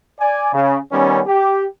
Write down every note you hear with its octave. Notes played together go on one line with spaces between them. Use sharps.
D5 G#5
C#3
D#3 G3 B3 C#4
G4